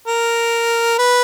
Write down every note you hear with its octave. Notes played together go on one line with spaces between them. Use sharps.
A#4
B4